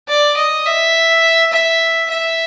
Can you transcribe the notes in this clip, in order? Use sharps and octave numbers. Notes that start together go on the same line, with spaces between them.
D5
D#5
E5
E5
E5